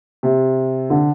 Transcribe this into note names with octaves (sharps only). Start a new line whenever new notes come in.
C3
D3